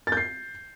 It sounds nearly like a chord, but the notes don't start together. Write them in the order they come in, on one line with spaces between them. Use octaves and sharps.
A6 G6 C7